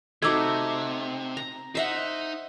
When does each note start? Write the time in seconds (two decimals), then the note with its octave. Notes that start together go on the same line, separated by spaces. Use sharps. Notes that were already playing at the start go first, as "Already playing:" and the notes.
0.22 C3 A3 D#4 F#4 D6 E6 G#6
1.37 A#5
1.75 D#4 C5 D#5 E5 F#5